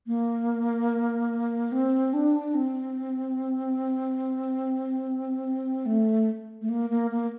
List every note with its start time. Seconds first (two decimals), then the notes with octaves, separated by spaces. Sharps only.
0.07 A#3
1.72 C4
2.13 D4
2.54 C4
5.86 A3
6.61 A3
6.69 A#3
6.90 A#3
7.11 A#3